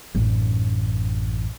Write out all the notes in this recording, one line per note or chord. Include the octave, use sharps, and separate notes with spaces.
A1 F#2